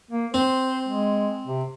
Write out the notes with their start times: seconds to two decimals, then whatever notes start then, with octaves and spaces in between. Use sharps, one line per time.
0.11 A#3
0.34 C4 C5
0.89 G#3
1.46 C3